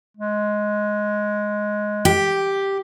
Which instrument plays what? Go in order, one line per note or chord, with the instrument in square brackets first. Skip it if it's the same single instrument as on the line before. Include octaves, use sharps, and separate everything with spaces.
[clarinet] G#3
[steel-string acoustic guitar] G4